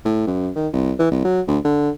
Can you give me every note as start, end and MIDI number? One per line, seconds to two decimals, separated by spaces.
0.05 0.25 45
0.27 0.50 42
0.56 0.68 51
0.73 0.93 36
0.99 1.08 52
1.11 1.24 36
1.25 1.41 54
1.48 1.59 38
1.65 1.90 50